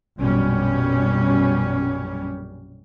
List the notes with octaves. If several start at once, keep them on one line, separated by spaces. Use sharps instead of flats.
A#1 F#2 B2 G3 C#4